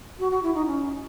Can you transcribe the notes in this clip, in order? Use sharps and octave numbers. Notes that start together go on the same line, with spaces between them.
F#4
F#4
E4
D#4
C#4